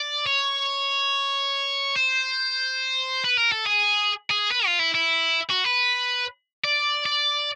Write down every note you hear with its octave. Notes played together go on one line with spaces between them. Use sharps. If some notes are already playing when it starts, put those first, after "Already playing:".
Already playing: D5
C#5
C5
B4
A#4
A4
G#4
G#4
B4
F4
E4
E4
F#4
B4
D5
D5